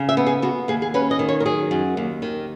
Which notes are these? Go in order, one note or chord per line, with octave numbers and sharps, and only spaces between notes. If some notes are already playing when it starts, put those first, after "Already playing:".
Already playing: C#3
E5
B3
G#4
B3 F#4
D#2 G#4
G#4
C#4 B4
D#5
D#3
C#5
A#4
F#3 G#4
F#2
D#2
D#3